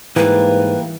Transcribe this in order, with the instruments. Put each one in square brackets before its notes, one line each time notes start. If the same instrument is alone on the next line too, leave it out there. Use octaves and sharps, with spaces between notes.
[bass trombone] G#2 [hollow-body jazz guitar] E3 [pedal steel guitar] G3 A#3 [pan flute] B4